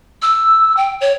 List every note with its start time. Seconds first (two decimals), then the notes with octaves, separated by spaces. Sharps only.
0.22 E6
0.77 G5
1.01 C#5